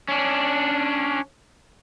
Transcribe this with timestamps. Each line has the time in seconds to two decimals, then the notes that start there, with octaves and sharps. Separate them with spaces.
0.08 C#4 D4